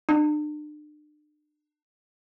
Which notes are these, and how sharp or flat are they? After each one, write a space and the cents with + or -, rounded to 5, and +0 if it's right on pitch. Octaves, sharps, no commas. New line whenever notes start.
D4 +40